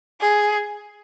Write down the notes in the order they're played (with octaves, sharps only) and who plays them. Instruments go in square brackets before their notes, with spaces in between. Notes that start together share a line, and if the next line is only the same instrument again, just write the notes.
[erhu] G#4